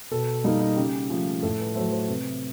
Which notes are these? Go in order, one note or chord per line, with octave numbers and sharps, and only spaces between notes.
B2 A4
G3 A#3 D#4
D#4
C#3 G4
F3 A3
A2 A4
B4
F#3 A3 C5
C5
C3 B4